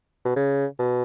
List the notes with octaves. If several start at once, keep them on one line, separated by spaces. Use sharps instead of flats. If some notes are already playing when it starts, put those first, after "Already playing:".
B2
C#3
B2